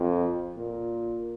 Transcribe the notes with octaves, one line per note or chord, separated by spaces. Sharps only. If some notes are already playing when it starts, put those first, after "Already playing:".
Already playing: F2
A#2